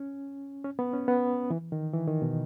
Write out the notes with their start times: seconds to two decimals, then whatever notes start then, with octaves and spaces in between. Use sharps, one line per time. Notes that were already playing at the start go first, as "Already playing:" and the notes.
Already playing: C#4
0.65 C#4
0.79 B3
0.93 C#4
1.08 B3
1.50 E3
1.72 D#3
1.93 E3
2.08 D#3
2.22 B2